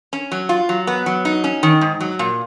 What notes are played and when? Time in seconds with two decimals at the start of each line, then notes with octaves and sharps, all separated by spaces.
0.13 C#4
0.32 F#3
0.49 F4
0.69 F#3
0.87 B3
1.06 F#3
1.25 D#4
1.44 C#4
1.63 D#3
1.81 G#2
2.00 F#3
2.19 A#2